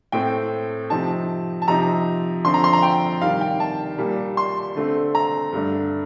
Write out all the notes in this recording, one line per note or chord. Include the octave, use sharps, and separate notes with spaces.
A2 A3 C4 G5
C3 F3 C4 D#4 A5
A5
C3 F3 C4 D#4 A#5
D3 F3 C4 C6
A#5
C6
A#5
G5
C3 D#3 G3 F5
G5
A5
A#2 G3 A#3
C6
D3 A3 C4
A#5
G2 D3 A3 D4